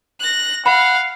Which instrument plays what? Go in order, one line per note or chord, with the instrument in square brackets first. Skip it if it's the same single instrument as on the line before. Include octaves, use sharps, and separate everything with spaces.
[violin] F#6 A#6
[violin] F5 [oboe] F#5 [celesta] B5